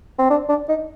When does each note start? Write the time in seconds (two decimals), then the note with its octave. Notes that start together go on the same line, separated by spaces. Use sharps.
0.18 C4
0.30 D4
0.49 D4
0.69 D#4